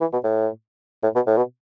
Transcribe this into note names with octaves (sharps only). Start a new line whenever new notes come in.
E3
B2
A2
A2
B2
A2
B2